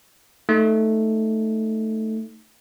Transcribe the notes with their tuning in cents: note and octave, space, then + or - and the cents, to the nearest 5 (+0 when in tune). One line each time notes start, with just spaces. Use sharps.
A3 +0 D#4 +5